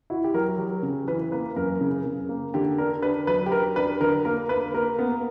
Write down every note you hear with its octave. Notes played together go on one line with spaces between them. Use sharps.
E4 F#4
G4
F#3 A#4
F#3 G4
C#3
E3 B4
A#3 B4
F#2 A#4
C#3
C#3
A#3
D3 G4
D4 A#4
D4 B4
F#3 B4
G4
F#3 A#4
D4 B4
D3 A#4
A#3 A#4
A#3 B4
A#3 A#4
A#3 B3